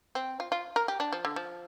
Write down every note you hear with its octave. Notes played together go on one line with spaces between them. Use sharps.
C4
F4
F4
A#4
G4
D4
F3
D3
F3